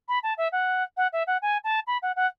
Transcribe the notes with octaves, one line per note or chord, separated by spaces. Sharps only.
B5
A5
E5
F#5
F#5
E5
F#5
G#5
A5
B5
F#5
F#5